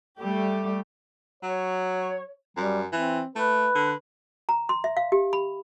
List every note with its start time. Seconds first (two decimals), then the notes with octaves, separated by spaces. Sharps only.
0.21 G3 A3 G4
1.43 F#3 C#5
2.57 F#2 G3
2.92 E3 C4
3.36 A3 B4
3.75 D3
4.49 A#5
4.69 C6
4.84 E5
4.97 F5
5.12 G4
5.33 B5